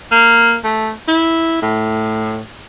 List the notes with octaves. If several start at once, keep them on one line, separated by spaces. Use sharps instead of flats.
A#3
A3
E4
A2